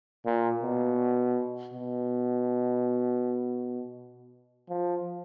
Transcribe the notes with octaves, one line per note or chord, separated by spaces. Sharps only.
A#2
B2
B2
F3